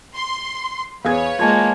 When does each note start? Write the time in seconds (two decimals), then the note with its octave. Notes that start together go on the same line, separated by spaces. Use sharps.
0.16 C6
1.05 E2 G#4 B4 C#5 F5 G#6
1.39 G#3 A#3 F4 G#5 A5 G#6